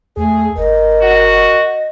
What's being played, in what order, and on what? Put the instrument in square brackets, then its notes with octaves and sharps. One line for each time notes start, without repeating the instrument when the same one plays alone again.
[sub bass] E2 [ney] A3 [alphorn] G#4
[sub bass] G1 [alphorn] A#4 [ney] D#5
[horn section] F#4